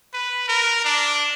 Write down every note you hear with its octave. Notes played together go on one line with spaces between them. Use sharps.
B4
A#4
D4